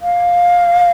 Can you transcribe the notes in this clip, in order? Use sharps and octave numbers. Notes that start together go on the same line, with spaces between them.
F5